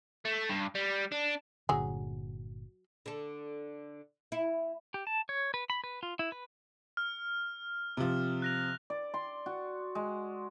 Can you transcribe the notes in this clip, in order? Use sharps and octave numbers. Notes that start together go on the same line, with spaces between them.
A3
G2
G3
D4
G1 A#2 D3 F#3 G#4
D3 A4
E4
G4
A5
C#5
B4
B5
B4
F4
E4
B4
F6
C3 F3
F#6 A#6 F7
D5
C6
F#4
G#3